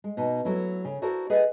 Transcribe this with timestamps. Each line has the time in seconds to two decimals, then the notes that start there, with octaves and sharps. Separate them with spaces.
0.04 G#3
0.17 B2 D#4
0.45 F#3 A3 E4
0.85 C#3
1.02 E4 F#4 A4 A#4 C5 D5
1.30 G#4 B4 D#5 E5 F#5